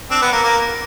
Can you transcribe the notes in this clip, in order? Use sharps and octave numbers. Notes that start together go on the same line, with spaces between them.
C4 D4
B3
A#3
A#3